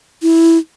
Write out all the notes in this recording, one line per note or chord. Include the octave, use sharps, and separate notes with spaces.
E4